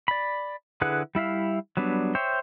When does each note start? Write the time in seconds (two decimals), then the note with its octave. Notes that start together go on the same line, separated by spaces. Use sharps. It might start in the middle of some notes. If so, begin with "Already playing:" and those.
0.08 D5 B5
0.81 D3 E4 G#4 B4 F#5
1.15 G3 E4 E5 F5
1.77 F#3 G3 B3 D4
2.15 C5 C#5 E5 G5